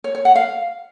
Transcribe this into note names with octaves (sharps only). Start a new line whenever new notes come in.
C#5
C#5
F#5
F5